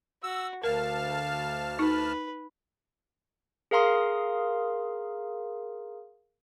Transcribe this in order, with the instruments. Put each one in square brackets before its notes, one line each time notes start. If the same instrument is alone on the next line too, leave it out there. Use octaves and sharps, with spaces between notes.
[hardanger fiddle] F#4 [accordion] E6
[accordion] D2 A5 F6 [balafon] A#4 [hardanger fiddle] F5
[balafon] D#4 [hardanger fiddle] B4
[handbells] G#4 A#4 F5 A#5 C6 D#6